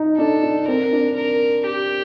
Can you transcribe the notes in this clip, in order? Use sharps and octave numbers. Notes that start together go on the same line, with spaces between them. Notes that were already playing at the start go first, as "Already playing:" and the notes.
Already playing: D#4
D4 A4
D4
C4 A#4
D4
A#4
G4